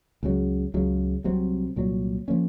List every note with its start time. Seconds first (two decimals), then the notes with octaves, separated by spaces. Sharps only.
0.23 C#2 C#3 F#3
0.74 C#2 C#3 F#3
1.24 C2 C3 F#3 C4
1.76 C2 A#2 F#3
2.28 F3 A#3 C#4